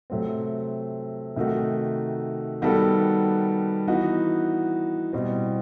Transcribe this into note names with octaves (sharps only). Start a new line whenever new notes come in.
C3 F#3 A3 C4
C3 D#3 A3 D#4 F#4
D#3 G3 B3 F#4 A4
E3 B3 D#4 F#4
B2 G3 C4 E4